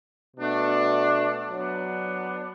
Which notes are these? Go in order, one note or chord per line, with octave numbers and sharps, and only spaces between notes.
B2 A3 D4
F#3 B3 D4